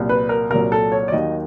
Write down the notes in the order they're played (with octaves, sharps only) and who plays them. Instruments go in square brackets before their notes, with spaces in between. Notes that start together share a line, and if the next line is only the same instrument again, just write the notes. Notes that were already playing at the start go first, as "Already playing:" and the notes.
Already playing: [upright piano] C2 A#2 F#3
B4
A#4
C2 A#2 F#3 A#4
A4
C#5
D5
D#2 D#3 F#3 D#5